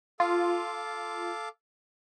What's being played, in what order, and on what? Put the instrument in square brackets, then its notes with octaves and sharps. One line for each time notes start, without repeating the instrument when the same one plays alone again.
[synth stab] F4 [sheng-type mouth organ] A4 F5 D6